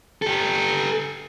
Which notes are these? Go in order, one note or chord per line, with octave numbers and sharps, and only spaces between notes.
G4 A4